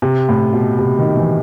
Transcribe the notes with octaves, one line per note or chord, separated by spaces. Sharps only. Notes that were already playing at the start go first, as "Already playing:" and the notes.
C3
A2
B2
C3
D#3
E3